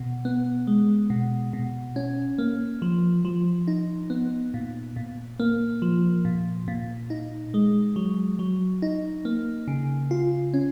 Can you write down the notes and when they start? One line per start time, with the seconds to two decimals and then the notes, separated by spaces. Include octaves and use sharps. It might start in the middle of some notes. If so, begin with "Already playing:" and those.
Already playing: B2
0.25 B3
0.67 G#3
1.10 B2
1.53 B2
1.96 C#4
2.38 A#3
2.82 F3
3.25 F3
3.68 D#4
4.10 B3
4.54 A#2
4.96 A#2
5.40 A#3
5.82 F3
6.25 A#2
6.68 A#2
7.10 D#4
7.54 G#3
7.96 F#3
8.39 F#3
8.82 D#4
9.25 A#3
9.68 C#3
10.11 F4
10.54 C#4